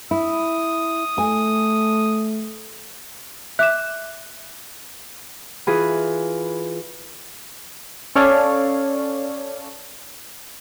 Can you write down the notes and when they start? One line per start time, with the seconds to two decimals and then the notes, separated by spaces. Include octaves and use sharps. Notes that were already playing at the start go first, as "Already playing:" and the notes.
0.11 E4 D#6
1.18 A3 G#5
3.59 E5 D6 F#6 E7
5.67 E3 F4 G#4 B4
8.15 C#4 A4 C#5 D5 F5